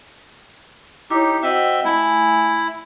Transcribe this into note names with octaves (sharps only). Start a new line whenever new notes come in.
D#4 E4 G4 C#5
C4 F#4 D#5 E5 F#5
A3 E4 G#5